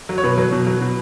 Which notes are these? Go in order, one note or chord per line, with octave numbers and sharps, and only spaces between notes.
F#3
C#5
B2 B4
F#3
B2
F#3
B2